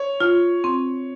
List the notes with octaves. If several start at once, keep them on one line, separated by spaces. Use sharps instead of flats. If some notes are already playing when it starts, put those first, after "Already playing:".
Already playing: C#5
F4
C4